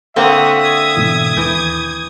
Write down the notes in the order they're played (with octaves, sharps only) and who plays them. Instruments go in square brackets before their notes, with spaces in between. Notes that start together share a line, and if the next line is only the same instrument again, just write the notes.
[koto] D3 A#3 C4 [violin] F#4 D#6 [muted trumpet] E5
[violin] D#6 G#6
[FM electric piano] G#2 B2 E3
[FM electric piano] D#2 G6 [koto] E3